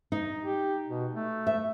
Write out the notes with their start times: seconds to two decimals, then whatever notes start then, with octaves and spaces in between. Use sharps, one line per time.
0.12 D#4
0.43 G4
0.88 B2
1.15 A3
1.47 E5